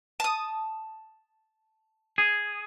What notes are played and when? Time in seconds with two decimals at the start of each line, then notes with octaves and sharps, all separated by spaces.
0.20 A5 D#6
2.18 G#4